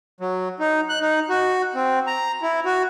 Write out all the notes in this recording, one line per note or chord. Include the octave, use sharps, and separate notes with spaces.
F#3
D#4
F#6
D#4
F#4
C4
A#5
E4
F#4